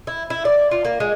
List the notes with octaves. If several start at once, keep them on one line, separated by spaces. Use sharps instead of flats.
E4
E4
D5
F4
A#3
G#3